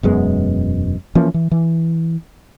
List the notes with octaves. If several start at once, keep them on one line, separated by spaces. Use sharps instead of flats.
E1 F#2 G#3 B3
E3 F3 A#3 C#4
E3
E3